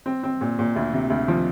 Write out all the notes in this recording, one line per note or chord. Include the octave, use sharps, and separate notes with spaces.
C4
C4
A#2
A#2
D2
C3
D2
F3